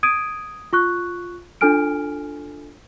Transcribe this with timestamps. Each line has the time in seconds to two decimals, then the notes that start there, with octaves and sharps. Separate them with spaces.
0.03 D#6 G#6 D7 D#7
0.73 F4 C#6 F#6
1.61 D4 F4 A4 G#5 F6 D7